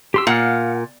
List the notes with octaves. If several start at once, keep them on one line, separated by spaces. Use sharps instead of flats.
G4 C6 E6
A#2 F5 F#5 F6